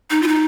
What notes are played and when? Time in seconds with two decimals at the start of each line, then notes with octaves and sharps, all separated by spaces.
0.10 D#4
0.22 F4
0.28 D#4